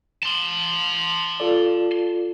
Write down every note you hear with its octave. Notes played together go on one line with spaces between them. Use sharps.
A5 C6
F4 A4 D5